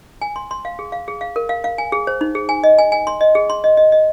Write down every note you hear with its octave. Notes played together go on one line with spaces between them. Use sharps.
G#5
C6
C6
F5
G#4
F5
G#4
F5
A#4
F5
F5
G#5
G#4
C5
D#4
G#4
G#5
D#5
G#5
G#5
C6
D#5
G#4
C6
D#5
D#5
D#5